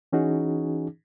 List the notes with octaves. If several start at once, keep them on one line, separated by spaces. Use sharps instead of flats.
E3 C#4 D#4 F#4 G#4